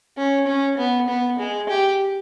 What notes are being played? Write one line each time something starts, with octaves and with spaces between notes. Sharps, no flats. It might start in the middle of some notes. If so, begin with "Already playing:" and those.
C#4
C#4
B3
B3
G#3
G4